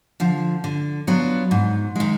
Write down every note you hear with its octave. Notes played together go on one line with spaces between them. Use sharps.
D3 F3
D3
F#3 B3 D4 F4
G#2
D#3 G#3